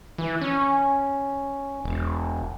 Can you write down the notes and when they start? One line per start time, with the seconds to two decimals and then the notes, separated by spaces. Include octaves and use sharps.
0.18 E3
0.41 C#4
1.84 E1